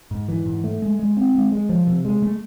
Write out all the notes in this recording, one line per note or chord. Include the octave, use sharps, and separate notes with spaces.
G#2
E3
G#2
A3
G#3
G#3
C4
G#3
G#3
F3
C3
G#3
A3